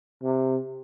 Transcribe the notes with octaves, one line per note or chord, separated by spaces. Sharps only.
C3